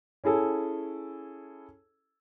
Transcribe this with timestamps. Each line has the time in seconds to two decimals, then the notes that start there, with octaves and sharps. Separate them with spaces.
0.24 C#4 E4 G#4 A4